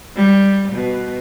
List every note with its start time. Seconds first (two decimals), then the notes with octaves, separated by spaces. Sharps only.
0.17 G3
0.72 B2